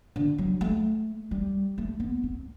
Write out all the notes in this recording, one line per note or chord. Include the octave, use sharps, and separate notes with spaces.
D3
F#3
A3
G3
A3
B3
C4